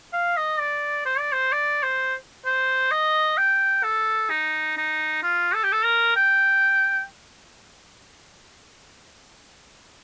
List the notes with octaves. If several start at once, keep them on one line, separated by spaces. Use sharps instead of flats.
F5
D#5
D5
C5
D5
C5
D5
C5
C5
D#5
G5
A4
D#4
D#4
F4
A4
G4
A4
A#4
G5